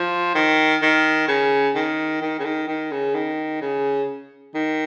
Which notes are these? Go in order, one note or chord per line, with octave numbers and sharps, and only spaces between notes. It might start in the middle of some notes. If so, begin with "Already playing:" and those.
Already playing: F3
D#3
D#3
C#3
D#3
D#3
C#3
D#3
D#3
C#3
D#3
C#3
D#3